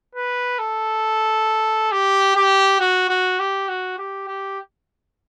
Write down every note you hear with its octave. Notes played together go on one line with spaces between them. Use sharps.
B4
A4
G4
G4
F#4
F#4
G4
F#4
G4
G4